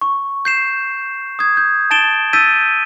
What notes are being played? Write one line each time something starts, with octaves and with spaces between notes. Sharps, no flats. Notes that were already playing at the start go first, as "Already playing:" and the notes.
C#6
G6 C7 E7
D#6 G#6
G6
A5 A6 D7 E7 G7
E6 G6 A6 B6 D#7